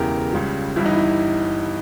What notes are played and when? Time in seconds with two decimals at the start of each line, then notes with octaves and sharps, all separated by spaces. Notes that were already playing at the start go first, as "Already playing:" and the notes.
Already playing: E1 E2 C#3 E3 G4 A#4
0.33 C#2 C#3 G3
0.76 G1 G2 E3 E4
0.86 D#4
0.96 E4